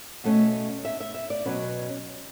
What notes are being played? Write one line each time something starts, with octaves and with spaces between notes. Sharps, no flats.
B2 A3 C#4
E5
E5
E5
D5
B2 F#3 C#4 B4